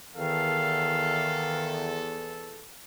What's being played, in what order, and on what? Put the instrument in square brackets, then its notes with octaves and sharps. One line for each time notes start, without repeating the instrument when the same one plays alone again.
[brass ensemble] E2 A4 [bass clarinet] D#3 [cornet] F5